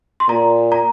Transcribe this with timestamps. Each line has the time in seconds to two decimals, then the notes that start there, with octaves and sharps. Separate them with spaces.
0.20 C6
0.29 A#2 A#5
0.72 A#5